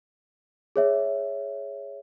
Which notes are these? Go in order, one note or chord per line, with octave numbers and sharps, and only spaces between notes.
G#4 C#5 E5